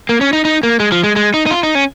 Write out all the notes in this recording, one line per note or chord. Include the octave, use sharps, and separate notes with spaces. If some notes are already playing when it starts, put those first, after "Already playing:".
A#3
C#4
D#4
D#4
A#3
G#3
F3
G#3
G#3
D#4
D#4
F4
D#4
C#4